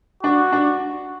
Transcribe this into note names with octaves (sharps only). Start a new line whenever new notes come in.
D4 F#4
D4